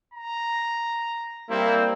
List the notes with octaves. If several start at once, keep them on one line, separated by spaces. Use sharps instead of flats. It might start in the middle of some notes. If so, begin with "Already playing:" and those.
A#5
G3 A#3 C4 E4